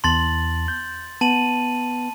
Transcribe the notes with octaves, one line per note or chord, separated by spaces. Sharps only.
E2 A5 C6 A6 F#7
G6
B3 A5 D#7 F#7